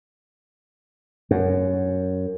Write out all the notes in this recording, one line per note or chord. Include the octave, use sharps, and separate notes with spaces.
F#2